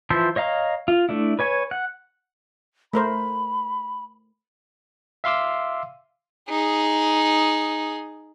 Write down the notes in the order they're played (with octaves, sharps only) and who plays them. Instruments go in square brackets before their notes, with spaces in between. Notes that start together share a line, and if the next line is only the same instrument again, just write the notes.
[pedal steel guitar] E3 F3 C5 E5 A5
C#5 D#5 F5 A#5
F4
A3 D4 E4
B4 C#5 G#5 C#6
F#5
[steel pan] A3 A#4 C5 [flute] B5
[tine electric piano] E5 F5 C6 D6 E6
[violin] D#4 G#4